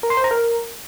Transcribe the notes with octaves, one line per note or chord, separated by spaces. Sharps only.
A#4
C6
C5
A#5
A#4